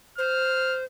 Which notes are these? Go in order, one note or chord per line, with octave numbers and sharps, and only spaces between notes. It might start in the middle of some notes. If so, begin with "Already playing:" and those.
C5 F6